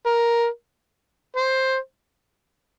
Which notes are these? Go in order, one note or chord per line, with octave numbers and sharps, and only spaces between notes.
A#4
C5